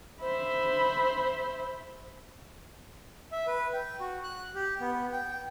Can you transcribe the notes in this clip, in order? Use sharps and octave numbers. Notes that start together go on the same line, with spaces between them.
C5 E5 B5
E5
B4
G5
F#4
F#6
G4
B3
G5
G5